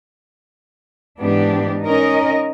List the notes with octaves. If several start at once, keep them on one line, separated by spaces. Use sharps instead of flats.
G#2 E3 B3 D4 G4
C#4 D#4 A#4 D#5